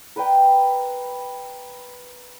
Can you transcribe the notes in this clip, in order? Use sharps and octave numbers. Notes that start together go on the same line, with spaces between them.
A#4 B4 D5 G5